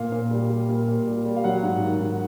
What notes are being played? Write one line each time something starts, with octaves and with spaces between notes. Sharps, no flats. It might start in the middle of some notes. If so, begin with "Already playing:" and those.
Already playing: A#2 F5
A#2
G3
G3
A#2
A#2
G3
G3
F5
F#3 F#5
G#2
D#3
G#2